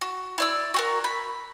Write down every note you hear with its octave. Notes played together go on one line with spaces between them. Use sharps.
F#4
E4 D5 E6
F#4 G4 A#4
B5